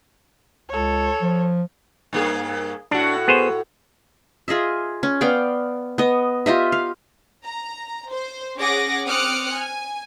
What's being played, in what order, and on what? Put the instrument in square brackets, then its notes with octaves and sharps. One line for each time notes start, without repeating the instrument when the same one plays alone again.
[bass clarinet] C#2 [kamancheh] A4 C#5
[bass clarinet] F3
[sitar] G2 A#3 G#4
[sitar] A2 F#4 [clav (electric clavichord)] D4
[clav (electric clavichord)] B3 G#4 C5
[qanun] F4 G#4 D#5 E5
C#4
B3 D5 F5 G5
B3 D#5
F4 G4 D#5 E5
F5
[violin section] A#5
C5
C#4 G#4 F#5 D6 A#6
C4 D6 D#6 F6 F#6 C#7
G#5